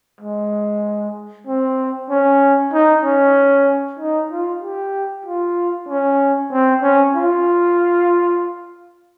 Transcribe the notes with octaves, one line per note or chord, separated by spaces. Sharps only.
G#3
C4
C#4
D#4
C#4
D#4
F4
G4
F4
C#4
C4
C#4
F4